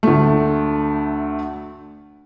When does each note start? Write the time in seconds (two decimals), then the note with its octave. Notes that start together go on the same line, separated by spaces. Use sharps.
0.03 D2 A3